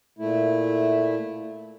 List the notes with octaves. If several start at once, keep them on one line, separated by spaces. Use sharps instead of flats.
A#2 A3 E4